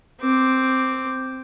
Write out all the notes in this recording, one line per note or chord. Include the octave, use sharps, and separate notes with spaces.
C4 D6